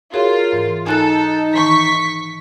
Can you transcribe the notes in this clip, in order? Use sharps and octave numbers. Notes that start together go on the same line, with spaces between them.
F4 F#4 G#4 A#4 C#5
G#2 E3
D#4 A4 G#5 F#6 A6
D#3 E3 C#6 B6